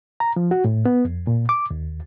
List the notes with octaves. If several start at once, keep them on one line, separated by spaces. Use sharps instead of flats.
A#5
F3
F#4
A2
B3
F2
A#2
D6
D#2